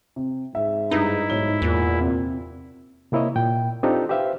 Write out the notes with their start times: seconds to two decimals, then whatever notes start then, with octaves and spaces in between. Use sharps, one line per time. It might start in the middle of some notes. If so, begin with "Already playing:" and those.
0.16 C3
0.55 G#2 E5
0.91 G2 D#4 E4
1.30 B1 G#2 C#5 G7
1.62 E2 A#2
2.00 C3
3.12 C3 A#3 E4 C#5 D#5
3.36 A#2 G5
3.83 C4 D4 D#4 F4 G4 A4
4.09 G4 B4 C5 E5 F5